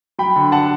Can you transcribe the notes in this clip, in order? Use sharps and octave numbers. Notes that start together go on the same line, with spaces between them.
F#3 G5 B5
D3
F#5 A5